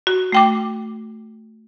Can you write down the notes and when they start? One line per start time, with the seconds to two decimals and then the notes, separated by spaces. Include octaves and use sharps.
0.07 F#4
0.32 A3 G5 D6